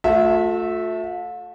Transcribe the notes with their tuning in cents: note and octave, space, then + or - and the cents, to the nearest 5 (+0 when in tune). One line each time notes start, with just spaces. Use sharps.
A3 +0 F4 +45 E5 -10